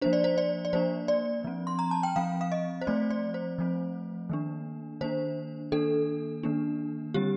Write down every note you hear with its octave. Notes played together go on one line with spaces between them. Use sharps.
F3 A#3 D4 C5
D5
C5
D5
D5
F3 A#3 D4 C5
D5
F3 C4
C6
A#5
A5
G5
F3 C4 F5
F5
D#5
C5
F3 A3 C4 D5
D5
C5
F3 A3 C4
D#3 A#3 D4
D#3 A#3 D4 C5
D#3 A#3 D4 A4
D#3 A#3 D4
D3 G3 C4 G4